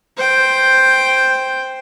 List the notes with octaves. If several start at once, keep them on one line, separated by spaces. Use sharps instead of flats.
C5 G5